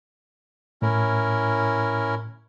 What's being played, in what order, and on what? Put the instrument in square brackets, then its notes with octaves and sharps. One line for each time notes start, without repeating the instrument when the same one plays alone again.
[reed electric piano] A2 [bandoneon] C#4 E4 A#4